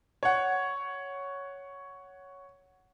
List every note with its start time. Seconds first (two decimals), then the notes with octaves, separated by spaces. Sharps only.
0.23 C#5 F#5